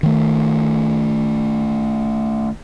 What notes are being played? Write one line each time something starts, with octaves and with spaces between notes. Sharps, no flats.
D#3 A3